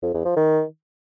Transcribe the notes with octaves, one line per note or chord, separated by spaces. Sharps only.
F2
E2
F3
D#3